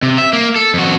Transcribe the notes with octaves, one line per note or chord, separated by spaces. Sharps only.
C3
E5
A#3
A4
F2 F#4